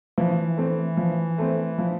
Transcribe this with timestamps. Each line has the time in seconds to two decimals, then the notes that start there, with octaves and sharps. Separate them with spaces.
0.18 E3 F3
0.57 A3 C4
0.97 F3
1.38 A3 C4
1.78 F3